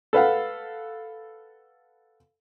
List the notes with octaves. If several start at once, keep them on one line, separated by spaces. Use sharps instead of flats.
A4 B4 F5 F#5